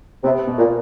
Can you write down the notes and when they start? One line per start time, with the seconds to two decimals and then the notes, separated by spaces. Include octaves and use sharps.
0.24 C3 B3
0.47 B2
0.58 A#2